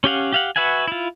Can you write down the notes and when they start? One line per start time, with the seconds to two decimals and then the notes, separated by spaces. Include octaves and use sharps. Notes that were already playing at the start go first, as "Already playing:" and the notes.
0.04 C#4 G4 F5 F#5
0.33 G4 F5 F#5
0.56 F#4 B4 E5 F#5 G#5
0.88 E4 F4